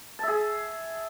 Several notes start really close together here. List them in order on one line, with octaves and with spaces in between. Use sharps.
A5 E5 G#4